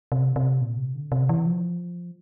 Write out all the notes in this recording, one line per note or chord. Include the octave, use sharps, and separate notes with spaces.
C3
C3
A#2
C3
D3
C3
E3
F3